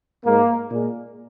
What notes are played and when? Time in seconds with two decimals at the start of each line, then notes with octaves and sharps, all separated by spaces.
0.25 G#2 G#3 A#3
0.71 A#2 G#3